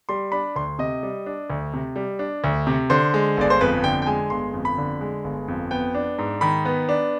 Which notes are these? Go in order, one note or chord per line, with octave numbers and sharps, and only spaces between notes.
G3 C6
D4 B5
D2 C6
C3 D#5
G3
D4
D2
C3
G3
D4
D2
C3
D3 C5
G#3
G1 D5
C5
F2 B4
D3 G5
G5
G#3 G#5
G1 C6
F2
B5
D3
G#3
G1
F2
B3 G5
D4
G#2
D#3 B5
B3
D4